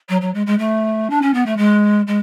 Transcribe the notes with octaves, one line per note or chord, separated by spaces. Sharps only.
F#3
F#3
G#3
G#3
A3
D4
C#4
B3
A3
G#3
G#3